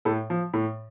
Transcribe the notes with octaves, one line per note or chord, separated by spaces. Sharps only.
A2 A4
F3
A2